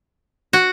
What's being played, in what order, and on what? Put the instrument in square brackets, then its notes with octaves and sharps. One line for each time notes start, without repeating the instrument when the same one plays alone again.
[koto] F#4